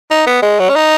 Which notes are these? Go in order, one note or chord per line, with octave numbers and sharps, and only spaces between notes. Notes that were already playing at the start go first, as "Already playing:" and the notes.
D#4
B3
G#3
F#3
C#4
D#4